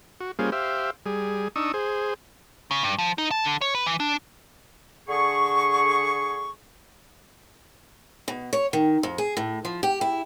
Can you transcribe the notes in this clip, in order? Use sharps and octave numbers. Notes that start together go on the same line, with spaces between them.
F#4
G3 A#3 C#4 F4 G#4 C5
G4 C5 E5 F5
G3 G#4
D4 D#4 C#6 D#6 E6
G#4 C5
C#3
G2
F3
D#4
A5
D3
C#5
B4
E3
D4
D3 G#4 C#6
B2
C#5
D#3
F2
G#4
A2
F3
G4
E4